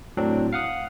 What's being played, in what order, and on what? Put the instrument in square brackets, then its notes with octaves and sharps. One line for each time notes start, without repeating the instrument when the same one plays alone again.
[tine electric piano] A2 F#3 C4 D4
F5 F#5 D#6